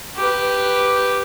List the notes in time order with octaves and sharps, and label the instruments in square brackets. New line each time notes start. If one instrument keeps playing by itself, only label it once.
[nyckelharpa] G4 B4